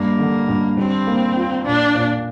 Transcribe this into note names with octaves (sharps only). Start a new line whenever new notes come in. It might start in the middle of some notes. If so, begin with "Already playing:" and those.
Already playing: G2 A#3
D3
G2
G3 C4
A#3
F4
A#2 D4
A#2